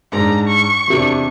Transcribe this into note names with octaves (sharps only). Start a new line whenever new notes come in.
G#2 D4 A#5
C#6
E2 C3 D4